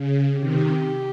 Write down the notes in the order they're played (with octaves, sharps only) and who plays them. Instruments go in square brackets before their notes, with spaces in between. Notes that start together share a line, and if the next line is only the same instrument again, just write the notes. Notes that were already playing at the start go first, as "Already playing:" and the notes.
Already playing: [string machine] C#3
[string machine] C3 D#3 [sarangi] G4